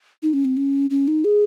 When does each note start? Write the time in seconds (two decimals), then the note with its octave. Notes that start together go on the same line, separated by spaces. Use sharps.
0.23 D#4
0.33 C#4
0.45 C4
0.57 C#4
0.90 C#4
1.08 D#4
1.24 G#4